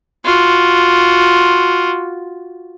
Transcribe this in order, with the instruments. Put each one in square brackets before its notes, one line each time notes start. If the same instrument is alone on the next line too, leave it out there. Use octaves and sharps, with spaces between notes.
[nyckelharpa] F4 F#4